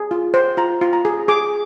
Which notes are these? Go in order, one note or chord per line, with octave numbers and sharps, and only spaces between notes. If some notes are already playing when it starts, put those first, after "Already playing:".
Already playing: G#4
F4
C5
F4 A#5
F4
A#5
G#4
G#4 D6